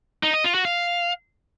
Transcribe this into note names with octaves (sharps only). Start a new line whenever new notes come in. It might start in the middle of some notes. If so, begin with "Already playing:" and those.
D#4
D#5
F4
F#4
F5